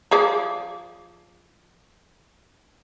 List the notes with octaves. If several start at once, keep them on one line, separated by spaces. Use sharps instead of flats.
F3 G#4 D5